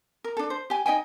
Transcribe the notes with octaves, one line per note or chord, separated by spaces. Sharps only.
A#4
D4 A4
C5
G4 G#5
D#4 D#5 G5 G#5